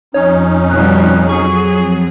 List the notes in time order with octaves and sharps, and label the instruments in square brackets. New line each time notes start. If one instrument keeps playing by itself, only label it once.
[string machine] F2 [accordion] C#4 D#4 [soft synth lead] C#5
[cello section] B2 F3 G3 [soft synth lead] F#6
[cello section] F#3 G#4 [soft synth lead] C#6